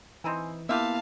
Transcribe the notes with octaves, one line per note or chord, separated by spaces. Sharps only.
E3 C4 D#4 E4 G#5 C6
A#3 B3 E4 F4 G4 E5 F5 A5